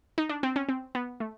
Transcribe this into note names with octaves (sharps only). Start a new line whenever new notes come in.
D#4
D4
C4
C#4
C4
B3
A3